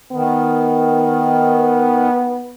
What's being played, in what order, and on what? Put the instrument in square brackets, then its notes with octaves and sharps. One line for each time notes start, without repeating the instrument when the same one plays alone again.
[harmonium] D#3 [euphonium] B3